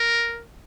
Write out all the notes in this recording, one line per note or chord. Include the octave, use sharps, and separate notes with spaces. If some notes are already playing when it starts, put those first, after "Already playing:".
Already playing: A#4